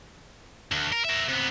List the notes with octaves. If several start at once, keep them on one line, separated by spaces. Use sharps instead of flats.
D2
A#4
A#4 E5
C3 B3